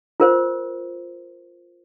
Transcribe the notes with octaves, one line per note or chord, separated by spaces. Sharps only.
F4 A#4 C5